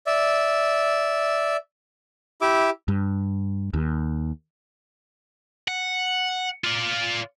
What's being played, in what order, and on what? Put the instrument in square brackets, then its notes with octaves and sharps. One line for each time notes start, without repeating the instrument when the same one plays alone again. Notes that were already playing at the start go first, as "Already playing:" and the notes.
[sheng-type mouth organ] D5 E5
E4 G4 E5 D6
[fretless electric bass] G2
D#2
[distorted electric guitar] F#5
F4 D5